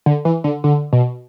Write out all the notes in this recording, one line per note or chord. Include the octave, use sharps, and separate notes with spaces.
D3
E3
D3
D3
B2